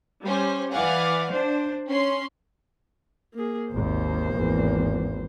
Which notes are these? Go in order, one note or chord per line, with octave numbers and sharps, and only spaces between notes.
G3 C#4 C5
E3 D5 F5 F#5 G#5
D4 C5
C#4 C6
A#3 G#4
G#1 D#2 A#3 C5
G#1 E2